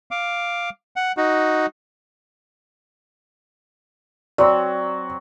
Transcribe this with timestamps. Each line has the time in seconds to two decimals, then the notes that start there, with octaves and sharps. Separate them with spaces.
0.11 F5 D6
0.96 F#5
1.17 D#4 F#4
4.38 F#3 C4 D5